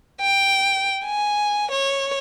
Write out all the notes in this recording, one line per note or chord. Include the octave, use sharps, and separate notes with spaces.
G5
G#5
C#5